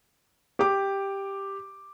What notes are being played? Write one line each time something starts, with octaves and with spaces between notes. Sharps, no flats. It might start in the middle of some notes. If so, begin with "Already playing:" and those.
G4 D6